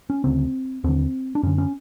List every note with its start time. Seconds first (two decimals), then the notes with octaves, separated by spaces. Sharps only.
0.10 C#4
0.24 D2 C#3 C4
0.84 D#2 D3 C4
1.35 D4
1.43 F#2 D3 C#4
1.58 C#4